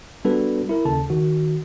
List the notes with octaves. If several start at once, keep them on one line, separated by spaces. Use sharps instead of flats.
G3 B3 D4 F#4 A4 B4
E4 A#4
D#2 C#3 A4 A5
D#3 F#4